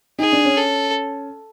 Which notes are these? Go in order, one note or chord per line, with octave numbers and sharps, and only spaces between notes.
D#4 G#4
D4
C#4
A4